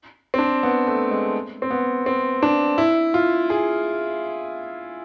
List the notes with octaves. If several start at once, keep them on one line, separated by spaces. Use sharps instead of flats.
C4
D4
B3
A3
G#3
C4
B3
C4
D4
E4
F4
G#4